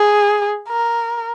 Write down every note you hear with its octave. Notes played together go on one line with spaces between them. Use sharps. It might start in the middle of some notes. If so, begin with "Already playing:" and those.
Already playing: G#4
A#4